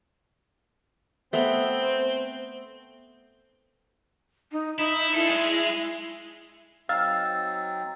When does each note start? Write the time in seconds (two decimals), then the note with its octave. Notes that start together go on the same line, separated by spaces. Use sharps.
1.33 A3 B3 C4
4.52 D#4
4.78 D#4 E4
5.14 D4 E4 A4
5.28 G#3 G#4
6.89 F#3 C4 D#4 F5 E6 A6